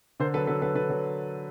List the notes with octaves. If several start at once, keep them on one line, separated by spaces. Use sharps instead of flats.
D3 A#4 C5
F#3 A4 B4
F#3 A4 B4
F#3 A4 B4
D3 A4 B4
F#3